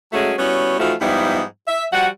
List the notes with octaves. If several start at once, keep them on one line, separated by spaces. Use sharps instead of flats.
F#3 G#3 A3 C#4 F#4
G3 B3 C#4 E4 F#4 C#5
E3 F3 A3 D#4 F4 F#4
G#2 F3 G3 B3 D#4 E4
E5
F3 G3 F#4 F#5